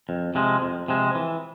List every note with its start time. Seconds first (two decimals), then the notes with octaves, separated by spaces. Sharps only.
0.09 F2
0.35 C3 F3 G#3
0.62 F2
0.88 C3 F3 G#3
1.15 E3